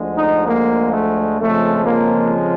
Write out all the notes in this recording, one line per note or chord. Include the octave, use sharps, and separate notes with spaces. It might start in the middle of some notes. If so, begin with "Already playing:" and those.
Already playing: D2 D3 F3 G#3
D#4
A#3
A3
F2 C#3 F3 G#3 A3
A#3